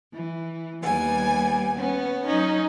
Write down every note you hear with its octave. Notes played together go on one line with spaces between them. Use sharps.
E3
D#2 G3 B3 G#5
B3 C#4
F#3 C#4 D#4